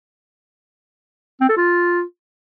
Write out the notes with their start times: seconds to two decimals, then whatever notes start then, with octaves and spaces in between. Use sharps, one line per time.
1.41 C4
1.49 A4
1.57 F4